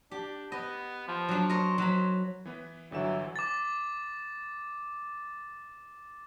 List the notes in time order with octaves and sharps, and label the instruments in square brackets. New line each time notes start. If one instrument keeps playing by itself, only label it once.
[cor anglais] D4 [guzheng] G4
[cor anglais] B3 [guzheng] D#5
[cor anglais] F3
[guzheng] F#3 D4
[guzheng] A#4 C#5 D#5 [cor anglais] C5
[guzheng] F#3 B5
[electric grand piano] E3 B3 B4
[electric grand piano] G1 D3 E7 [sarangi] E3 [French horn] F#3
[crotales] D6 A6